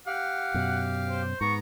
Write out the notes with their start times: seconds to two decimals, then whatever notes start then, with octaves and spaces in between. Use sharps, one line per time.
0.07 G4 F5 F#5
0.54 F#2 B2
1.10 C5
1.41 G#2 B3 A#5 C#6